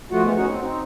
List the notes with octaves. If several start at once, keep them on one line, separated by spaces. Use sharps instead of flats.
F3 A3 F4 F#4 F#5
G#3 A3 B3
C#4 D#4 F#4 F#5
C4
C4 D#4